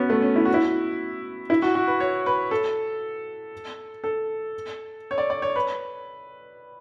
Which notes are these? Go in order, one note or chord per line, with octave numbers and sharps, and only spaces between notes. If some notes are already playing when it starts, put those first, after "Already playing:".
Already playing: B3 C#4 F#4
A3
C#4
E4
F#4
E4
E4
F#4
F#4
B4
C#5
B4
A4
A4
C#5
D5
D5
C#5
B4